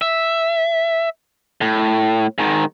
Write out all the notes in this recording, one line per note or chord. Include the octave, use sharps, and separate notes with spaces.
E5
A2
G#2 D#3